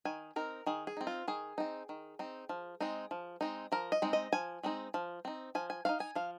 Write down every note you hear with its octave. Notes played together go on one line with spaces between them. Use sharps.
D#3 G#5
C4 D#4 A#4
D#3 G#4
G#4
C4 D#4
F4
D#3 G#4
C4 D#4
D#3
C4 D#4
F3
G#3 C4 D#4
F3
G#3 C4 D#4
F3 A#4
D#5
G#3 C4 D#4
D#5
F3 G#5
G#3 C4 D#4
F3
C4 D#4
F3 G#5
G#5
C4 D#4 F5
G#5
F3 F5